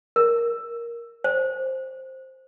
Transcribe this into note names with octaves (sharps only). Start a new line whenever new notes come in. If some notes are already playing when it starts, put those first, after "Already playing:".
A#4
C5